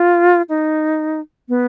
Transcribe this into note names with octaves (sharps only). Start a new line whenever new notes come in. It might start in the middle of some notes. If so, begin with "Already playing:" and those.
Already playing: F4
D#4
B3